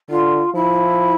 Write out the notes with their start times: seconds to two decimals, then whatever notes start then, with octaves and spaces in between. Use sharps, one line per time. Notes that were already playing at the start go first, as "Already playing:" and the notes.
0.09 D3 F4
0.54 F3 E4